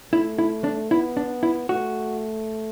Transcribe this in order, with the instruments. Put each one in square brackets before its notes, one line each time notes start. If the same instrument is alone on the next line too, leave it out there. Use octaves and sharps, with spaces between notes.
[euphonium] A3 [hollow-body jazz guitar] E4
[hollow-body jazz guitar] E4
D4
[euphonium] B3 [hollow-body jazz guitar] E4
[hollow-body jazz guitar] D4
E4
[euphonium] A3 [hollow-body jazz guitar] F#4